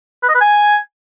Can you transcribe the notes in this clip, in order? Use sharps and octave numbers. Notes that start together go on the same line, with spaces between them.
B4
D#5
B4
G#5